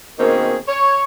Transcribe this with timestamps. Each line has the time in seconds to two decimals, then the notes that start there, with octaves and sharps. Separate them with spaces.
0.19 B2 D#3 A#3 C4 C#4 G#4
0.67 C#5